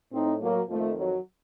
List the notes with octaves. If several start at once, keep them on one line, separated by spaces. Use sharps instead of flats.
A2 C4 D#4
F#3 A#3
F2 D#3 F3 A3
F#3